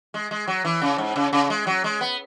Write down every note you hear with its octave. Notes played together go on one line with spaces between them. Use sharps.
G#3
G#3
F#3
E3
C#3
G#2
C#3
C#3
G#3
F#3
G#3
B3